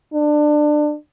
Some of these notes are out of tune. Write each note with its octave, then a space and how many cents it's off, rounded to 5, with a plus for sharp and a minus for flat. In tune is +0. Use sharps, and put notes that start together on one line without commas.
D4 +25